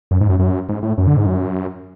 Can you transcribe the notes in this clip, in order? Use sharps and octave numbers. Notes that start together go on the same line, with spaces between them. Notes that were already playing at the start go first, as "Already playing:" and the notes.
F#2
G#2
F#2
F#2
G#2
A2
F#2
D3
G#2
F#2